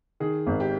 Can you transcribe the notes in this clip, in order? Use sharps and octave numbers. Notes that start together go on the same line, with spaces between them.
D#3 G#4
G#1
G4